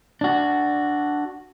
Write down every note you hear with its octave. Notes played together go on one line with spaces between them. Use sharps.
D4 F#4